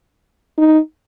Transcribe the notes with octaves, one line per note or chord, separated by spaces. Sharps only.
D#4